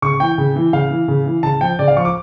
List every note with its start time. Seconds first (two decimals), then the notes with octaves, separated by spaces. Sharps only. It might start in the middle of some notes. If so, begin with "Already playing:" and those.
0.02 C#3 C#6
0.20 E3 G5
0.38 C#3
0.56 E3
0.73 C#3 F5
0.91 E3
1.08 C#3
1.26 E3
1.43 C#3 A5
1.61 F3 G5
1.79 C#3 D5
1.88 F5
1.97 F3 C#6
2.05 D6